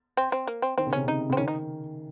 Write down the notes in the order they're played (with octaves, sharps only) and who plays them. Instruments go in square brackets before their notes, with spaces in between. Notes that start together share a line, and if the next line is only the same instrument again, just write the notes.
[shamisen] C4
C4
A#3
C4
[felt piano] D#3 [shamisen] C4
[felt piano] C#3
[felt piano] C3 [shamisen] C#4
[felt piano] C#3 [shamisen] D#4
[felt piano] C#3 [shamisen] C4
[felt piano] D#3 [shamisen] C#4
[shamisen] D#4